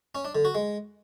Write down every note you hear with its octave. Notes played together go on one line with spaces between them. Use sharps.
C#4
D4
D3
F#4
G#3